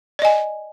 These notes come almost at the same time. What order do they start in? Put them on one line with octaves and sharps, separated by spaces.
D5 D#5 G#5